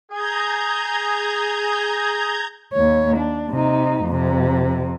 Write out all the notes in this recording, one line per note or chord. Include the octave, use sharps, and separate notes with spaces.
G#4 A#5 G6 G#6
D#2 C#5
D4
C3 D#4
F2 C3